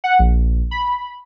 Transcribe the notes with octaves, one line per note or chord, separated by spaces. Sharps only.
F#5
A#1
B5